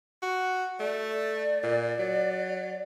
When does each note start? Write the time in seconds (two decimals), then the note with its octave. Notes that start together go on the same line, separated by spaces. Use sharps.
0.22 F#4
0.80 A3 D5
1.63 A#2
1.99 F#3